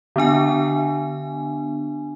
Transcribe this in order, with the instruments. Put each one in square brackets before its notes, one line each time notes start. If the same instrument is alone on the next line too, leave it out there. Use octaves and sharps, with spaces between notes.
[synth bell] D3 B3 D4 G#5